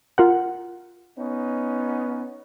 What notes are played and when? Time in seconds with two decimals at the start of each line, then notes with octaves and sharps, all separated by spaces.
0.18 F4 A#4 F#5
1.18 B3 C#4 D#4